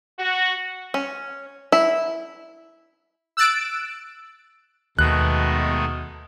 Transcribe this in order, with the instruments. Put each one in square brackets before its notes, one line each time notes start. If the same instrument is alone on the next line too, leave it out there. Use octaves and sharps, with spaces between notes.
[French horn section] F#4
[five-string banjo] C#4
E4
[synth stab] E6 F#6 A6 D7
[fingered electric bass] D#2 [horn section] B2 [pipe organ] D#3 G#3 A3 [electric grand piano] F#6